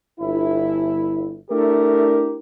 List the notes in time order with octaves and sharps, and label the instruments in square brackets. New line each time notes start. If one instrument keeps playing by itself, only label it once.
[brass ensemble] G1 E4
A3 D4 E4 G4 A#4